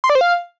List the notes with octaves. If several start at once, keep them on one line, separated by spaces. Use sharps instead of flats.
C6
D5
C5
F5